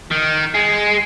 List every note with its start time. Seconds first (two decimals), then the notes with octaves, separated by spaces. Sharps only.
0.12 D#3
0.55 G#3